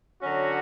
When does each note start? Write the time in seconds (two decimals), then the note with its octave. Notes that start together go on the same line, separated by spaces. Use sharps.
0.22 D3 F#3 C#4 F#4